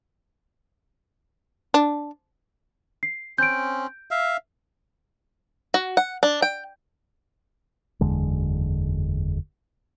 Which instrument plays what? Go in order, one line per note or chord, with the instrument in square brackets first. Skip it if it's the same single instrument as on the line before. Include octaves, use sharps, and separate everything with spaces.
[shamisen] D4
[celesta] C7
[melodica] C4 C#4 [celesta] G6 D7
[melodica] E5 F5
[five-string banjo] F#4
F#5
D4
G5
[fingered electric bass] F#1 E2 D3 G#3